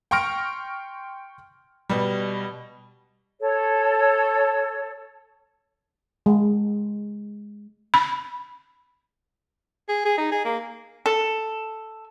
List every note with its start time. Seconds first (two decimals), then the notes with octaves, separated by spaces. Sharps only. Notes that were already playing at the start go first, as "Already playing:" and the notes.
0.11 G5 C6 C#6 F6 A#6 D7
1.90 B2 G3
3.40 A4 C#5
6.26 G#3
7.94 B5
9.89 G#4
10.05 G#4
10.18 D#4
10.32 G#4
10.45 A#3
11.06 A4